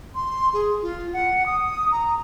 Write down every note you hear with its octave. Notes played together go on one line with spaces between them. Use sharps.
C6
G#4
F4
F#5
D#6
A#5